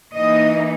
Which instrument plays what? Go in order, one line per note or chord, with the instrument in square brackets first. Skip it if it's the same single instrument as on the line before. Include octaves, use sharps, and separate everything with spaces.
[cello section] E3 A#3 D#4 D#5